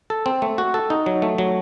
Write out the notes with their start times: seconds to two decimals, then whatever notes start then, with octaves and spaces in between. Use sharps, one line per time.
0.10 A4
0.26 C4
0.42 A3
0.58 F#4
0.74 A4
0.90 D#4
1.06 F#3
1.22 A3
1.38 F#3